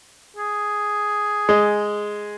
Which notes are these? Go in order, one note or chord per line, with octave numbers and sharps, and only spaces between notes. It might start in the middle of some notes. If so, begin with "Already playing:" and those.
G#4
G#3